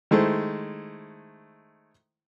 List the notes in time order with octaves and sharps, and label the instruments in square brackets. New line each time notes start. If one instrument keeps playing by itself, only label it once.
[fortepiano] D#3 G#3 A3 E4 C5